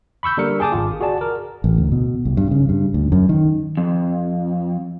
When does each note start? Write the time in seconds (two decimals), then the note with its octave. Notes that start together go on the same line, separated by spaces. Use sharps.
0.23 B5 C#6 E6 G6
0.37 D3 G3 A#3 A#4 C#7
0.60 G#4 G5 A5 D6 D#6
0.72 G#1 F4
1.01 F#4 G#4 D5 A5
1.21 A#4
1.64 A1
1.78 D2
1.92 B2
2.25 C2
2.37 G2
2.51 C#3
2.69 G2
2.94 D2
3.12 F#2
3.29 D#3
3.77 F2